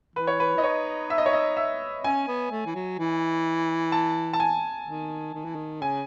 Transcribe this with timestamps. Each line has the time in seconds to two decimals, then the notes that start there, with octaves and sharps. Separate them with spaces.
0.16 E3 B4
0.27 C#5
0.40 B4
0.56 E4 D#5
0.63 D#4 C#5
1.10 E5
1.18 D#5
1.26 C#5
1.33 D#5
1.57 E5
2.04 C#4 G#5
2.27 B3
2.52 A3
2.66 E3
2.75 F#3
2.99 E3
3.92 A5
4.33 A5
4.40 G#5
4.87 D#3
5.34 D#3
5.45 E3
5.55 D#3
5.81 C#3 G#5